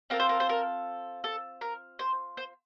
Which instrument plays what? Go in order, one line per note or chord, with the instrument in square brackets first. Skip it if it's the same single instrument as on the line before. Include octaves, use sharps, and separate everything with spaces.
[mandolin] C4 F4 A4 A#4
C5
A#4
C5
A#4
A4
A#4
C5
C5